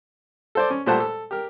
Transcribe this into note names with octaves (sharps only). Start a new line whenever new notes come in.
A4 C5 D5
C#4
A#2 G3 A3 C5 F#5 A5
A4
G4 A#4